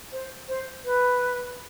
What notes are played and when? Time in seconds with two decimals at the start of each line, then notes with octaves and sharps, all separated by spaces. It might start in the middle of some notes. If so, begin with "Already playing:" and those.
0.12 C5
0.48 C5
0.85 B4